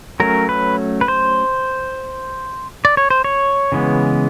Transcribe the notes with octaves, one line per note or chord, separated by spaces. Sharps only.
F#3 A3 C#4 A#4
B4
B4
C5
D5
C#5
C5
C#5
C#3 E3 G#3 B3